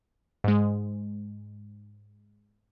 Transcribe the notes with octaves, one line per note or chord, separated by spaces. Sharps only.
G#2 G#3